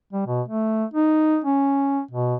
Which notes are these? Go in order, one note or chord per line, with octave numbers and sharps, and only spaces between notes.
G3
B2
A3
D#4
C#4
B2